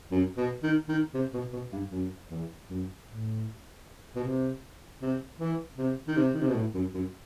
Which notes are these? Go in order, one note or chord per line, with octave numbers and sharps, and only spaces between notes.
F#2
B2
D#3
D#3
C3
B2
B2
G2
F#2
E2
F#2
A2
B2
C3
C3
E3
C3
D#3
C3
D#3
C3
B2
A2
F#2
F#2